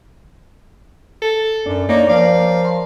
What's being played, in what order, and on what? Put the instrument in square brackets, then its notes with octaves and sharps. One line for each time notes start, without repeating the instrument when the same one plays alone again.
[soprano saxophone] A4
[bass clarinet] F#2 [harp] D4
[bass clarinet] A#3 [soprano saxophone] D#4 [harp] C#5 D5 A#5
[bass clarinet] F3 [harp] A#4 D5 [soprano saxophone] F5
[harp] C6